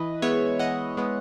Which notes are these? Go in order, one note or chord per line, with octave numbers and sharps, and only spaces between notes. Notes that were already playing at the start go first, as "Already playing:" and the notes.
Already playing: E3 B4 D#5
G#3 B3 C#5 E5
E3 D#5 F#5
G#3 B3